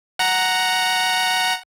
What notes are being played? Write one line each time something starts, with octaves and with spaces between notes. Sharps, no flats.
F#5 A#5